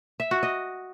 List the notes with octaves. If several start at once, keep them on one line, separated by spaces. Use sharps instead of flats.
E5
F#4
D#5